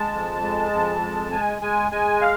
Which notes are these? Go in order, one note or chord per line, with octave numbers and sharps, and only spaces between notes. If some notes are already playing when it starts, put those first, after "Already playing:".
Already playing: G#3 A5
F2
G#3
F2
G#3
G#3 G#5
G#3 G#5
G#3 G#5
F5